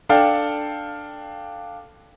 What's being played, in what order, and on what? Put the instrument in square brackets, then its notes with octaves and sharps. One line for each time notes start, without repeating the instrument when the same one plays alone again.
[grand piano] D4 A4 F5 G5